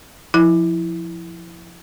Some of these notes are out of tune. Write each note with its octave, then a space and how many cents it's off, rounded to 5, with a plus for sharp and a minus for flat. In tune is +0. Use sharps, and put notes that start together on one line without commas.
F3 +0 E4 +0